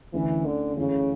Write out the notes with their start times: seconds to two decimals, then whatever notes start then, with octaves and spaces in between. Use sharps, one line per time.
0.13 D2 D3 E3 A3 C#4 E4
0.45 D3
0.77 F#2 C#3 E3 A3 E4